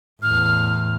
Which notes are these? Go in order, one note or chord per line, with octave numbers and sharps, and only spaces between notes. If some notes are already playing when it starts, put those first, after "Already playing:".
E2 A2 F6